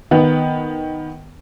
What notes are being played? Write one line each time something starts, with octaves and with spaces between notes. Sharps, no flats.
D#3 B3